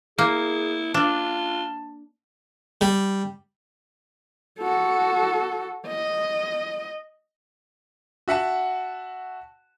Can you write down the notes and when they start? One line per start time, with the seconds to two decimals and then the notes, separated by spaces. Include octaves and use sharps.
0.18 A#3 E4 G#4
0.94 D4 F4 A5
2.81 G3
4.60 F#4 A4
5.88 D#5
8.28 F#4 E5 F#5 A5